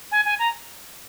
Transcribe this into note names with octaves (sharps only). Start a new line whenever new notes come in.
G#5
G#5
A#5